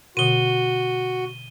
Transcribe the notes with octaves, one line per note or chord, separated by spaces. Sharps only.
B2 D3 F#4 D#7 G7